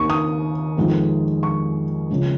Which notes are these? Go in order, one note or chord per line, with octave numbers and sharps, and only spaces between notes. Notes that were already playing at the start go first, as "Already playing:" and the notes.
Already playing: D#2 D#3 A#3 C#6
D#6
F2 D#3 G#3
C#6
C#3 F3 G#3